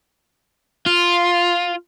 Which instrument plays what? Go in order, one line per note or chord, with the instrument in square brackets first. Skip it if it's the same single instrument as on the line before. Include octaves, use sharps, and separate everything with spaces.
[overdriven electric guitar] F4